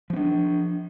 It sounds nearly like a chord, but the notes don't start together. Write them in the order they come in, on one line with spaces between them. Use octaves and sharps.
F3 C4 D4